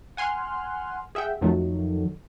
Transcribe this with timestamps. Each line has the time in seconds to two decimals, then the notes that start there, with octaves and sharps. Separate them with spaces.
0.17 F#5 G#5 C6 F6 F#6
1.15 G#4 E5 F#5 G5
1.41 F2 D#3 F#3 A3